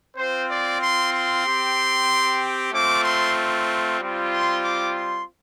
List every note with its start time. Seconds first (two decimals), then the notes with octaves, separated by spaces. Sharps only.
0.17 C4 F4 C5
0.49 D5
0.80 C6
1.13 C6
1.45 C4 G4
2.73 A3 C4 F4 D6
3.04 C6
4.00 G3 C4 F4
4.32 C6
4.64 D6
4.96 C6